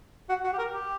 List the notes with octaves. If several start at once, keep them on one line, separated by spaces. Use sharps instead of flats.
F#4
F#4
G4
A#4
G4